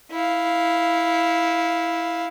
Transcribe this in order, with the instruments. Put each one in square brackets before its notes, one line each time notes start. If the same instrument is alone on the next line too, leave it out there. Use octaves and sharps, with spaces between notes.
[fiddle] E4 F5